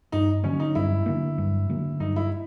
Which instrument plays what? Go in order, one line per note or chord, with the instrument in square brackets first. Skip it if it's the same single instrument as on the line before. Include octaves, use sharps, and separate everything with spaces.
[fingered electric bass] G2 [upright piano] D#4
[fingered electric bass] D3 F#3 A#3 [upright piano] C#4
[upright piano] D#4
[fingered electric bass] G2 [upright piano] E4
[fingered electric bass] D3 F#3 A#3
G2
D3 F#3 A#3
[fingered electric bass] G2 [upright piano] D#4
[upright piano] E4